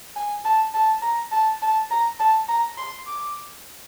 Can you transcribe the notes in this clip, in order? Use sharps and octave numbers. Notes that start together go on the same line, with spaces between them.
G#5
A5
A5
A#5
A5
A5
A#5
A5
A#5
C6
D6